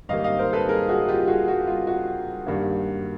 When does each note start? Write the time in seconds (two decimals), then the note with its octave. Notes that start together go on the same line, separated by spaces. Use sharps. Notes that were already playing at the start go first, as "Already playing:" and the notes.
0.09 G#2 D#3 G3 A#3 D#5 F5
0.24 D#5 F5
0.39 A#4 C5
0.53 A4 B4
0.68 G#4 A#4
0.89 F#4 G#4
1.08 F4 G4
1.28 F#4 G#4
1.48 F#4
1.67 F4
1.87 F#4
2.46 G2 D#3 G3 A#3